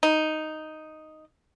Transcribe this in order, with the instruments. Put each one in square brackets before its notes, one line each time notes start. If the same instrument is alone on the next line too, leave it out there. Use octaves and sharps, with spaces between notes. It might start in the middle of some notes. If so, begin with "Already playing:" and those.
[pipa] D#4